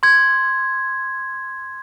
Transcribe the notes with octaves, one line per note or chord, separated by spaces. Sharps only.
C6 G#6